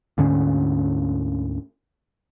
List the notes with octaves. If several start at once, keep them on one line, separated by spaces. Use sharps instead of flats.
D2 G#2 D3 C#4